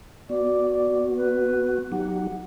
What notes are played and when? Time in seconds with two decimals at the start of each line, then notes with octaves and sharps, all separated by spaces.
0.29 B3 F#4 D5
1.16 B4
1.92 F#3 D#4 G4 F#5